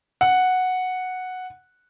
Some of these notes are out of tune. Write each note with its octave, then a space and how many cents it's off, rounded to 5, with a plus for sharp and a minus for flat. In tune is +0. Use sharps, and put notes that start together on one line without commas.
F#5 -5